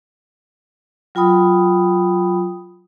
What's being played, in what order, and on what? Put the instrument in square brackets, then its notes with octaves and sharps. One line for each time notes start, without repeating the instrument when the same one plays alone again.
[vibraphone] F#3 F4 G5 B5 D#6